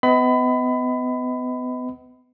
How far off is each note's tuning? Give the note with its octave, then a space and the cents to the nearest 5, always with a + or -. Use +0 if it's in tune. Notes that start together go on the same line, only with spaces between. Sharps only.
B3 +30 D#5 +35 B5 +25